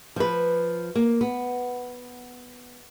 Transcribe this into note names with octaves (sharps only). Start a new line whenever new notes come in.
F3 B4
A#3
B3